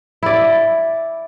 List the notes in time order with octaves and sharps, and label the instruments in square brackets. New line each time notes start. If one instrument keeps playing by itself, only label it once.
[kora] E4 D5